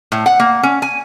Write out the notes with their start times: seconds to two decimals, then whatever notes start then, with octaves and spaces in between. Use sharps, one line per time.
0.12 A2
0.26 F#5
0.40 A#3
0.63 C#4
0.82 G#5